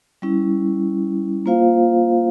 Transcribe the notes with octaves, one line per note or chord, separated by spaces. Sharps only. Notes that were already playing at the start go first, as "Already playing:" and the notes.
G3 C#4 E4
A#3 F4 C5 F5